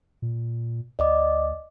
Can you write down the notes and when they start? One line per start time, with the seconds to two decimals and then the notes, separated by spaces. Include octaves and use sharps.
0.22 A#2
0.99 D2 D5 D#5 D6